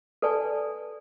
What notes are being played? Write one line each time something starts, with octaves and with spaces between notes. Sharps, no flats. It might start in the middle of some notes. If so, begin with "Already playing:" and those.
A4 B4 D5 G#5 A5